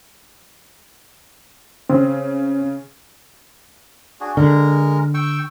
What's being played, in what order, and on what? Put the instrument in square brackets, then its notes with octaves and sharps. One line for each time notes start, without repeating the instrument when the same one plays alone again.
[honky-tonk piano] C#3 [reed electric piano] C4
[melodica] D4 F#4 G#4
[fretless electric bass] D3 [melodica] G#3 A#4
[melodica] G5 C#6 E6